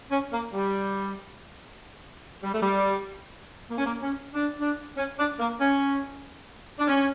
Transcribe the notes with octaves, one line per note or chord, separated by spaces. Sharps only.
C#4
A#3
G3
G3
A3
G3
A#3
C#4
A#3
C#4
D4
D4
C#4
D4
A#3
C#4
D4
C#4